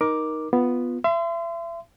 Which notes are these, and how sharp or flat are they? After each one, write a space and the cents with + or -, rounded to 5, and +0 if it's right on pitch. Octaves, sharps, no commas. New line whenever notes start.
D#4 +0 A#4 +15 D6 +0
B3 +0 F4 +0
E5 +35 C6 -30